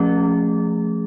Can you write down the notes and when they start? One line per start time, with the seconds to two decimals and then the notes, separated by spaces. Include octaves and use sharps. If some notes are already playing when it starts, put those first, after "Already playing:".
Already playing: F3 A3 C#4 G#4